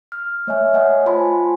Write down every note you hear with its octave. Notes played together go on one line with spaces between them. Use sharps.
F6
A3 C#5 D#5 E5 G#5 F6
A3 C#5 D#5 F#5 G#5
F4 C5 G#5 A5 B5 C6